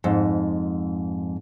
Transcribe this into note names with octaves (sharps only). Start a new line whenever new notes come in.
F2 G#2